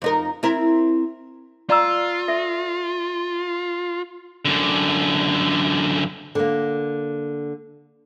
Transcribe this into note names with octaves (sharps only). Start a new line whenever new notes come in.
F2 D#4 A#4
C4 E4 A#4
F4 D5 A#5 E6
A4 E5
F#2 D3
D3 A#3